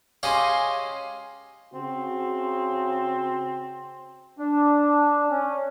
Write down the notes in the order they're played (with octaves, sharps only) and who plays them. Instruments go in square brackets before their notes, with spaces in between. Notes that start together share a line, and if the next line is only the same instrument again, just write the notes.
[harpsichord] G#3 C#4 G4 [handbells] F5 G#5 C6
[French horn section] C#3 [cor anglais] C4 [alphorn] F#4
[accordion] D4
C#4